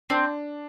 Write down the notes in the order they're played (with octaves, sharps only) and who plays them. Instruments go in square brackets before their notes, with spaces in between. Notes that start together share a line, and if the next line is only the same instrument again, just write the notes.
[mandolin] C4 [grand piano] D4